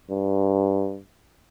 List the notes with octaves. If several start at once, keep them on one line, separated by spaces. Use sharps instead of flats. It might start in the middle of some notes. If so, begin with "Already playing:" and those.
G2